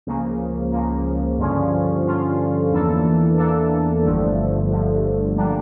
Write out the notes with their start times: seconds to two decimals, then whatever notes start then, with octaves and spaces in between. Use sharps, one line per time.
0.07 C#2 C#3 F3 A#3
0.72 C#2 C#3 F3 A#3
1.39 G2 D3 F3 C#4 F4
2.05 G2 D3 F3 C#4 F4
2.71 E2 E3 A#3 D4 A4
3.38 E2 E3 A#3 D4 A4
4.04 G1 G2 D3 F3 A3
4.70 G1 G2 D3 F3 A3
5.37 D3 G3 A#3 D4